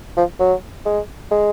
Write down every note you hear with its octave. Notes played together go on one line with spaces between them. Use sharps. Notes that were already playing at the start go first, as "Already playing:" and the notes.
F3
F#3
G#3
G#3